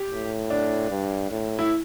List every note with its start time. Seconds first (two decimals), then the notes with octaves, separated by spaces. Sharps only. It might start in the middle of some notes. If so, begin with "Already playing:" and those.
Already playing: G4
0.11 A2
0.50 D4
0.90 G2
1.31 A2
1.59 E4